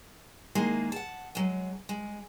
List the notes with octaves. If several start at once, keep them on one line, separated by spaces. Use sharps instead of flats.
D#3 G#3 A#3 E4 G#4
F#5 A5
F#3 G#3
G#3